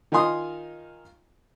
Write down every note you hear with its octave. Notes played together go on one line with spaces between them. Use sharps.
D#3 D#4 F4 G#5 C6 D#6